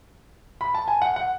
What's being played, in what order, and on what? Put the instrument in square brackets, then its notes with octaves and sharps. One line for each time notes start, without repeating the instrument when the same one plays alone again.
[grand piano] B5
A5
G#5
F#5
F#5